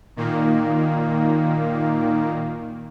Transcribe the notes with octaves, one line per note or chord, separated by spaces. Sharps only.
A#2 D#3 A#3